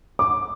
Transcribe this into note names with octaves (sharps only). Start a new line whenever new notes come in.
D6